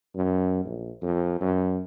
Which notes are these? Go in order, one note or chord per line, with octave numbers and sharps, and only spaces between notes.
F#2
A#1
F2
F#2